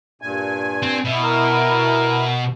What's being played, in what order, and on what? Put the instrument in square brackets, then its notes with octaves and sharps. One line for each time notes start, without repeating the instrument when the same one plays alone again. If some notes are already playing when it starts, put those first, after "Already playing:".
[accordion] G2 A#2 G#5
[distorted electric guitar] C4
[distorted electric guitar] B2 [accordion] E4
[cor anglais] A#4